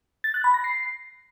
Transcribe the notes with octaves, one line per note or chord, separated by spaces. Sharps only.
A6
F#6
B5
A#6
C7